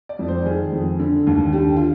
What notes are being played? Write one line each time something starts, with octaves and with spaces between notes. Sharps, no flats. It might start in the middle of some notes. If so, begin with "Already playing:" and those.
D5
F2
C5
D#3 G#4
F2
D3
D#2
D3 G4
F4